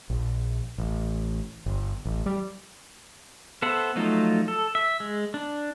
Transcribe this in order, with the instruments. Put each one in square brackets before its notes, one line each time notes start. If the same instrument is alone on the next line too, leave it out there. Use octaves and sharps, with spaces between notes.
[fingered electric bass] A#1
A1
G1
A1
G3
[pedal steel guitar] B3 A4 C5 E5 F#5
F3 F#3 A3 D#4 F4
A4
E5
G#3
D4